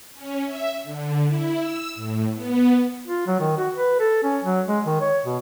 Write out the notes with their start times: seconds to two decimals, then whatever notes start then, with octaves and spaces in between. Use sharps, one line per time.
0.14 C#4
0.44 E5
0.83 D3
1.26 E4
1.59 E6
1.95 A2
2.34 B3
3.07 F4
3.27 F#3
3.39 D#3
3.57 F#4
3.75 B4
4.00 A4
4.23 C#4
4.44 F#3
4.67 G#3
4.86 D#3
5.00 C#5
5.25 B2